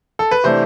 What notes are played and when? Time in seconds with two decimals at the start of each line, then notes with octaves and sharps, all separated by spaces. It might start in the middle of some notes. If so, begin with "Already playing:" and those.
0.19 A4
0.31 B4
0.44 C3 E3 A3 D4 C5